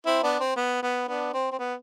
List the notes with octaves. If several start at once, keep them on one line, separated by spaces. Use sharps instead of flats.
C4 E4
B3 D4
C4
B3
B3
B3 D4
C4
C4
B3